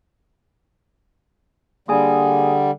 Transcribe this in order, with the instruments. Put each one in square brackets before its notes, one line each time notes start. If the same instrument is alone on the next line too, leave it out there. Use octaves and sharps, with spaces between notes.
[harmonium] D3 G3 [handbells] A#3 G#4 G#5